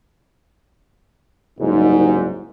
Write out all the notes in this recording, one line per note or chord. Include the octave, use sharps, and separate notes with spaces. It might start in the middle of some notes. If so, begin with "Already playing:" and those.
F#1 C2 G#2 D#4